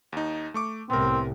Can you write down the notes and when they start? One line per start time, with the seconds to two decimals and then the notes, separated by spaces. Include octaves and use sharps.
0.12 D#2 D#4
0.54 A3 C#6 D6
0.90 C2 A2 B3 C4 A#4